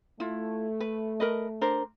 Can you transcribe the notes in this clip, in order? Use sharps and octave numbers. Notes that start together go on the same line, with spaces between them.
A3 E4 F4
B4
A#4 B4 D#5
D4 A#4 C5